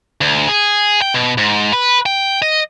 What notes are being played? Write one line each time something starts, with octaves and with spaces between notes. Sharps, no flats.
D2
G#4
G5
B2
G#2
B4
G5
D#5